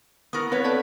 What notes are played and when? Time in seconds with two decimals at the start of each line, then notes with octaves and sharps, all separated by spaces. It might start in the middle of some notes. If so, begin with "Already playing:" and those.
0.33 B3 E4 A#4 C#6 D#6
0.52 B3 C4 B4 C#5
0.64 A4 D5 A5